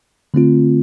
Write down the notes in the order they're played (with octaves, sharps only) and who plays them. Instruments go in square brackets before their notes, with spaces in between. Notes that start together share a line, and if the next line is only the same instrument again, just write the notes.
[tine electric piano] D3 A3 C4 F4